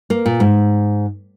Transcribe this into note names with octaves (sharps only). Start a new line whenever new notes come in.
A#3
A#2
G#2